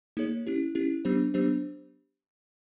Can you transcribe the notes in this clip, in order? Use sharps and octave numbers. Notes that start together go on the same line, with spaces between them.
A#3 D#4 G#4 C#5
C#4 E4 G4
C#4 E4 G4
F#3 B3 D4 G4 C5
F#3 B3 D4 G4 C5